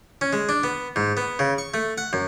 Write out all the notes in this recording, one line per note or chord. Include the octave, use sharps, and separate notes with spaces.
C#4
G#3
D4
B3
G#2
B3
C#3
C#6
A3
F#5
F#2